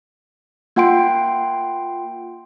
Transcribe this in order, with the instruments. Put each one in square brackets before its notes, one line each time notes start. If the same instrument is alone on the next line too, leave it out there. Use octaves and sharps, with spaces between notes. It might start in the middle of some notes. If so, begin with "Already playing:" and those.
[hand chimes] A#3 F4 F#5 G5 C6 D7